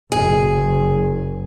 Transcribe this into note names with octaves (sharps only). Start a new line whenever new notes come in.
F#1 G#4